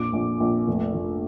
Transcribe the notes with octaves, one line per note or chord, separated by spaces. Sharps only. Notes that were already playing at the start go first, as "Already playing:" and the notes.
Already playing: A#1 F2 D6
A#1
A#1
F1
F1